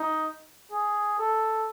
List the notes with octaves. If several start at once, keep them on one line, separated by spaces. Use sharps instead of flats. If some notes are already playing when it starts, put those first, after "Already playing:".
Already playing: D#4
G#4
A4